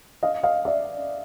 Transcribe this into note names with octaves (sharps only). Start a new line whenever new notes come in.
D#5 F5
D#5 F5
D5 E5